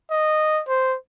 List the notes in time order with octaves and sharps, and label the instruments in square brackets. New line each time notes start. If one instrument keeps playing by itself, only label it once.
[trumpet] D#5
C5